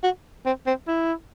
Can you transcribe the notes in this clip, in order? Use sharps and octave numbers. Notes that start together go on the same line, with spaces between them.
F#4
C4
C4
E4